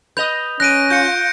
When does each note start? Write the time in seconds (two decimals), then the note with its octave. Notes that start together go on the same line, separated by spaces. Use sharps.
0.17 B4 D#5 G6 F7
0.60 C#4 F#6 A#6 D7 D#7
0.90 F4 G6 C#7